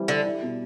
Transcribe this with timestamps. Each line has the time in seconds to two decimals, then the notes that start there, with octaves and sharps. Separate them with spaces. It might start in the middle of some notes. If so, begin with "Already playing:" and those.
Already playing: E3 G3 C4
0.08 D3 G4
0.26 E4
0.42 B2